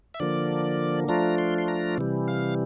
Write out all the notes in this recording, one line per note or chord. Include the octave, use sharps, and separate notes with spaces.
E5
D3 F3 A#3 D5
F3 A3 D4 F4 A#5
C6
C6
A#5
C3 E3 G3
F5